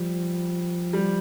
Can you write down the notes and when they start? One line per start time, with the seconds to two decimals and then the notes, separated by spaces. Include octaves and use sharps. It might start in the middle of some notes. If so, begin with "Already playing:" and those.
Already playing: F3 G3
0.93 G3